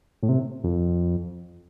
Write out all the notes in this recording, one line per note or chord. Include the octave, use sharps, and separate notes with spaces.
A2
C3
F2